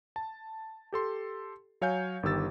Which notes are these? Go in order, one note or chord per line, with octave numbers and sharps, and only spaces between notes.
A5
G4 A4 C6
F#3 C#5 F5 G#5 G6
G1 D#3 G4 E6 A6